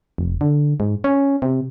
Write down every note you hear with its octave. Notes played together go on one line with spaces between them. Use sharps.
F1
D3
G#2
C#4
C3